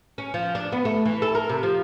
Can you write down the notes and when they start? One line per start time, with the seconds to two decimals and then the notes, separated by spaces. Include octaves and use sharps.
0.18 C#4
0.34 F3
0.55 D4
0.72 B3
0.85 A3
1.06 E3
1.22 A4
1.35 A#4
1.49 C3
1.63 F3